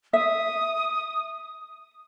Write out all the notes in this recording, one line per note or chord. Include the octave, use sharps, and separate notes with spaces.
E5 D#6